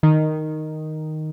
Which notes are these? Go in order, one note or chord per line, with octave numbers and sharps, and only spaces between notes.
D#3